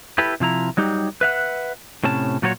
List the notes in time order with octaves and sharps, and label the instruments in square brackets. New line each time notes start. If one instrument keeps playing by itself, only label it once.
[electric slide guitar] E4 G4 A4 B4
C3 F3 E4 A#5
F#3 G3 D#4 G4
B4 E5 F#5
A2 C3 C#4 A5
A#2 F#3 F4 F#4 B4 C#5